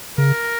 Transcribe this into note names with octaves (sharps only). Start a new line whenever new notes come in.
C#3 A#4